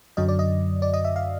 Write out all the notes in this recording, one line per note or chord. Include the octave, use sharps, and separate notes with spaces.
F#2 D3 F#3 D#5
D5
D#5
D5
D#5
E5
F5